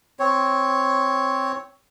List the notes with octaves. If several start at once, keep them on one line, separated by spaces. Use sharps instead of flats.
C4 C#5